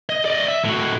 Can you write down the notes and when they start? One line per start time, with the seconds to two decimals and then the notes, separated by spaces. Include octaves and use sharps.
0.09 D#5
0.25 D5 D#5
0.48 E5
0.65 A2 F#4